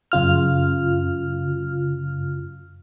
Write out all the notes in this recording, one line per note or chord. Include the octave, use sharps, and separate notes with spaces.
F#2 C#3 F4 F6